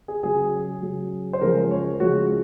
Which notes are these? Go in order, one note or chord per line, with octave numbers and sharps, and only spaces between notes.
G#4
C#3 F#3 G#4
C#3 F#3
C5
C#3 F3 G#3 A#4
C#5
C#3 F3 G#3 F#4